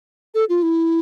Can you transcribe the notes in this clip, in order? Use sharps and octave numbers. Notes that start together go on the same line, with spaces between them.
A4
F4
E4